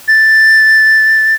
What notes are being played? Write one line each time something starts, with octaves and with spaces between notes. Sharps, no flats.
A6